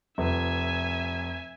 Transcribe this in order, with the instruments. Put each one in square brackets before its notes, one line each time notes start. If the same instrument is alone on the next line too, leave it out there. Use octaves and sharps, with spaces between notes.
[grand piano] F1 B4 [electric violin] E5 G#5